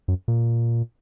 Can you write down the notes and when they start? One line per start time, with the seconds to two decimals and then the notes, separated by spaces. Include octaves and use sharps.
0.08 F#2
0.28 A#2